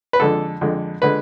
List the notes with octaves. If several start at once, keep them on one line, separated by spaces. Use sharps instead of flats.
B4
F2 D3 G#3 A4
F2 D3 G#3
D3 G#3 B4